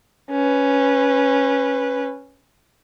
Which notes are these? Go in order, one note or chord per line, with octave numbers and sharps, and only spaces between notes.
C#4 B4